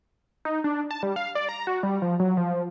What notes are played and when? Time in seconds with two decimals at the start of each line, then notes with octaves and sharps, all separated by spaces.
0.45 D#4
0.64 D4
0.91 A5
1.03 G3
1.16 F5
1.35 D5
1.49 A#5
1.67 F#4
1.83 G3
2.02 F3
2.20 F#3
2.37 F3